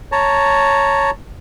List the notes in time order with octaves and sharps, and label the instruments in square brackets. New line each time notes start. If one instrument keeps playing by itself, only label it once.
[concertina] C#5 A5 A#5